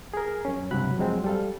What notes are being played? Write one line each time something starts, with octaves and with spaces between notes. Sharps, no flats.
G#4 A#4
F#2 C#4
C#2 G2 C3 F#3 B5 F#6
F2 F#3 G#3 C4
G3 A4 F5